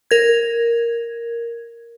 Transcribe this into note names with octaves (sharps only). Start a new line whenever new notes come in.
A#4 G#6